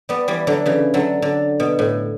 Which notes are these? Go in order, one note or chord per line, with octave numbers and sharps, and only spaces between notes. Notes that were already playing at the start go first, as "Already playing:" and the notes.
G3 B3
E3 G3
D3 F#3
C#3 E3
D3 F#3
D3
B2
A2